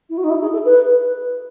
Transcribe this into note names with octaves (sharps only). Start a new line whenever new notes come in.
E4
F#4
D#4
E4
G#4
A4
B4